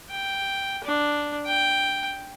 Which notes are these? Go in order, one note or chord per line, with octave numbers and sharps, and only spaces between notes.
G5
D4
G5